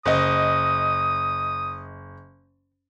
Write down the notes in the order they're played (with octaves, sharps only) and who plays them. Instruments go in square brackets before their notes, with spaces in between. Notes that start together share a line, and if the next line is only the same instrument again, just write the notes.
[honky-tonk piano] F#1 D#5 [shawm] D#6